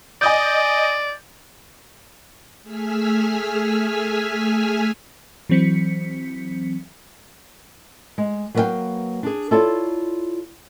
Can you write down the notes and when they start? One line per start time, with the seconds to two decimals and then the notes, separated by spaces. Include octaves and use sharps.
0.22 D5 D#5 G#5 D#6 G6
2.62 A3 G#4 G#5 E6 F6 B6
5.49 E3 F#3 C4 B6 C#7
8.18 G#3
8.55 F#3 A#3 B4 D5 F5 G5
9.23 D4 G#4
9.51 E4 F4 A4 C#5 D5